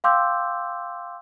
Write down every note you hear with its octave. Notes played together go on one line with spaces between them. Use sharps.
F5 G5 C6 D6 E6 G6